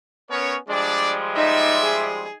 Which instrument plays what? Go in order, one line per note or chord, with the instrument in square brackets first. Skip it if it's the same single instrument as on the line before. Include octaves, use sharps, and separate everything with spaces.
[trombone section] B3 C#4 [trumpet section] A#4 C#5
[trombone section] F3 G3 G#3 [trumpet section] D4 D5
[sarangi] D#4 [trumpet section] D5 E5
[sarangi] G#4